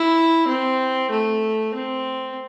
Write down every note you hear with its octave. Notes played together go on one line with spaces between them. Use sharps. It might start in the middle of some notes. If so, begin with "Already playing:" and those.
Already playing: E4
C4
A3
C4